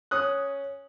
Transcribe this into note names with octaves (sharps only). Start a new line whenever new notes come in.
C#4 D#6 F#6